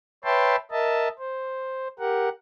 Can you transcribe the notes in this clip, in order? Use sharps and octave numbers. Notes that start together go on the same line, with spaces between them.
B4 C#5 E5 G5 A5 C6
A#4 D#5 E5 A5
C5
G4 A#4 F#5